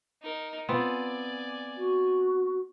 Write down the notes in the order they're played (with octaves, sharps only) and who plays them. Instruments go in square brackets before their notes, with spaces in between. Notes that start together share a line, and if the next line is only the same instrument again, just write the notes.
[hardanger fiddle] D#4 A#4
[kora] B3 C4 F4 [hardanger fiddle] D5 G#5
[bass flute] F#4